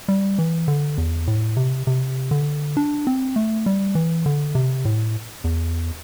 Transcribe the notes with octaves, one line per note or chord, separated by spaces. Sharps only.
G3
E3
D3
E2
A2
C3
C3
D3
D4
C4
A3
G3
E3
D3
C3
A2
E2